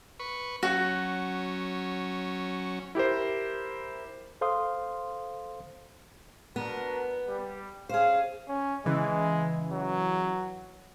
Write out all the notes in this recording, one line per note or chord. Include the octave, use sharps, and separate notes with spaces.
B4 C#6
F#3 C#4 F#4
E4 G4 A#4 C5
A4 C5 F5 C6 D#6
B3 D4 F#4 A#4
G3
C#4 G#4 C5 F5
C#4
C#3 E3 G#3
F#3